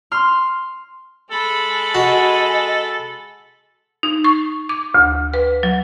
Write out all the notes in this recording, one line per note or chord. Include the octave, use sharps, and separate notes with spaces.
C6 F6
G#3 A4 B5
F#4 D#5 G#5
D#4
C#6
D6
D2
B4
F#3